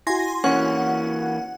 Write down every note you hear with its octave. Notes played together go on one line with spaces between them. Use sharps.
E4 F#4 G#5 C6 A#6
E3 A#3 C#4 F#5